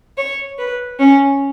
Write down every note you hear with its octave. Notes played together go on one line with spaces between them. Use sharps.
C#5
B4
C#4